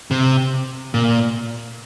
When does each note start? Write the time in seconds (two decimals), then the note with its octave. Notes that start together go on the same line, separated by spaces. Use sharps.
0.11 C3
0.94 A#2